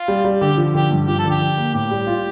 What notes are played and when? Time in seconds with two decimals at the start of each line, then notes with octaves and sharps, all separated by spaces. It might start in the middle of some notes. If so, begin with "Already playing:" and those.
Already playing: F4
0.08 G3
0.24 G3
0.41 D3 G4
0.57 F3
0.74 D3 G4
0.91 G2
1.07 F3 G4
1.19 A4
1.24 D3
1.30 G4
1.41 D3
1.57 A#3
1.74 A2 G4
1.91 G3
2.07 F4